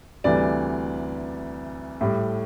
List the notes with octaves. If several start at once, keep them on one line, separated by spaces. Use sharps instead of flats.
D2 C3 E3 G3 D5
A2 G3